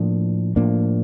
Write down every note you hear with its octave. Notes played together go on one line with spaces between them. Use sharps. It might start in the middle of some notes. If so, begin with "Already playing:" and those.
Already playing: A2 F3 A#3 D4
A2 F3 A#3 D4